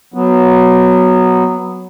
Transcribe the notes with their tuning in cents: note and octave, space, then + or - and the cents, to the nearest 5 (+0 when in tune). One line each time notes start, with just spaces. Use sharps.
F#3 +0 B3 +0